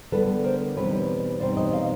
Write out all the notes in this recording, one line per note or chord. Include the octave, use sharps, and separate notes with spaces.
D3 G3 B3 A4 B4
A#4 C5
E2 B2 G3 C4 D#4 B4 C#5
E2 B2 G3 C4 D#4 C5 D5
C#5 D#5
D#5 F5